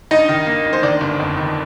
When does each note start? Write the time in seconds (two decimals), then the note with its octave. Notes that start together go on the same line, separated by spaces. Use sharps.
0.11 G2 D#4 D#5
0.29 D#3
0.47 A#3
0.65 A1
0.73 C5
0.83 D#3 D4 D5
1.01 G1
1.20 F2
1.37 D#3